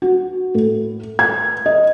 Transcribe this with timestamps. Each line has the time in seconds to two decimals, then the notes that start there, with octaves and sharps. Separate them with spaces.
0.02 F#4
0.55 A2
1.19 G#6
1.66 D#5